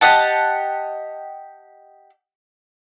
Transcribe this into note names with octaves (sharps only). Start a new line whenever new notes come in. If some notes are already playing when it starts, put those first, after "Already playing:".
G4 D#5 F#5 A5